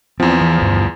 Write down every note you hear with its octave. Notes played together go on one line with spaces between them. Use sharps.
E2 F3 C4
E3
D2 G2 G3